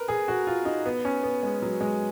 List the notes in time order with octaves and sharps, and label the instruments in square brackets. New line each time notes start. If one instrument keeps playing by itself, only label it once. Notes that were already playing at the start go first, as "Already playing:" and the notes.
Already playing: [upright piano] A#4 B4
G#4
F#4
F4
D#4
B3
C#4
B3
G#3
F#3
G#3